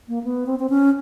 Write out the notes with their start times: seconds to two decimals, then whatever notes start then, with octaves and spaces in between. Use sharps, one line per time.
0.08 A#3
0.24 B3
0.47 C4
0.59 C4
0.70 C#4